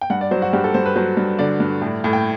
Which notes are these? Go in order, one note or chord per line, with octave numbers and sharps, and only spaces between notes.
G5
G2 F#5
D5
F#3 C5
F#4
G2 G4
A4
G2 C5
B4
F#3 C5
G2
D3 D5
G2
A2
A2
G5